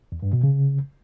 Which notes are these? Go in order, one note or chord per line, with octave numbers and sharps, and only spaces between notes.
E2
G2
B2
C#3